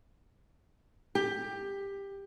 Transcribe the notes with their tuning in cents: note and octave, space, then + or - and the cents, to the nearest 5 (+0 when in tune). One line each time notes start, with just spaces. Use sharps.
G4 +15